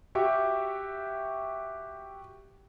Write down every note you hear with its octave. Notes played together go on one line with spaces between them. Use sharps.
F#4 G4 E5 G5 C#6